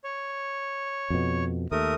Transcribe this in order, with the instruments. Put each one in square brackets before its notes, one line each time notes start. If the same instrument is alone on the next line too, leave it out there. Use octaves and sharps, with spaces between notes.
[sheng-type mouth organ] C#5
[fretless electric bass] F2 B2
[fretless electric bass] D#2 [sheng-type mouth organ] A3 A#4 D#6